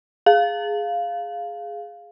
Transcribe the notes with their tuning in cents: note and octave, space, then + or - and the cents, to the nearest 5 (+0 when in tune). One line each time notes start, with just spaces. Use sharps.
G#4 +0 F5 +0